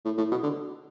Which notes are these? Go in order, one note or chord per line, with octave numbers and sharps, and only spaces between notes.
A2
A2
B2
D3